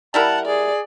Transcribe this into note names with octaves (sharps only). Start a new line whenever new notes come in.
G3 E4 A#4 F#5 A5
G#4 D5